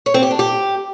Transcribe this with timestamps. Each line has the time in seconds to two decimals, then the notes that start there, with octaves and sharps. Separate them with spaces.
0.06 C#5
0.14 C4
0.23 G4
0.31 D4
0.39 G4